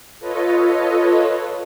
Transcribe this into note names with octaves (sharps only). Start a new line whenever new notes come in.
F4 A4 B4 C#5 D#5